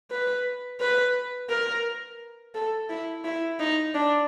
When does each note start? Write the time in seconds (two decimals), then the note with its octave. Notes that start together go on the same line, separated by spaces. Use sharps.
0.11 B4
0.80 B4
1.50 A#4
2.55 A4
2.90 E4
3.24 E4
3.60 D#4
3.94 D4